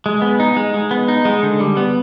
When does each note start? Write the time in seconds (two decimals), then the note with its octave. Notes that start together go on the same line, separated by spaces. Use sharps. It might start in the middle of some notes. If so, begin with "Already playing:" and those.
0.06 G#3
0.22 B3
0.40 D#4
0.57 G#3
0.74 G#3
0.91 B3
1.08 D#4
1.25 G#3
1.43 D3
1.60 G3
1.77 B3